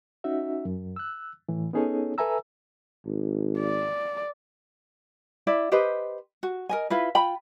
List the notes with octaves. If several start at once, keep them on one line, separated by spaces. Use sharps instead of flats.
C#4 D#4 F#4 E5
F#2
E6 F#6
A2 E3
B3 C#4 D#4 G#4 A4 C#5
A4 B4 E5 G#5 A#5 E6
G#1
D5
E4 D5 E5
G4 B4 C5 D#5
F#4
A#4 D#5 G#5
E4 F4 B4
F4 G5 B5